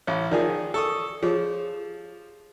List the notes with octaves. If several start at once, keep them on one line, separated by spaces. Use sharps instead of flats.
A1 C#5 F5 B5
D#3 F3 G#4 A#4 D5 A5
A4 C#6 D#6
F3 G4 G#4 C#5